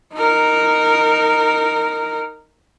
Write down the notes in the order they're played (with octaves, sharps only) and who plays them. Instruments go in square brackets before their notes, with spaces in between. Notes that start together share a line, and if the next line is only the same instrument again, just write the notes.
[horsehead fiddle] D#4 A#4